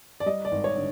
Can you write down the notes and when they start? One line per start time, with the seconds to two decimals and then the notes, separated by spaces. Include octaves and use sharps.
0.20 D5
0.26 G3 D#5
0.45 D5
0.52 G#1
0.64 C#5
0.76 D3